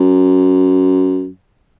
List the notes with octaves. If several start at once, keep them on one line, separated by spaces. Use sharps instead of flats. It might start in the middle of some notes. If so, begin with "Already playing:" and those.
Already playing: F#2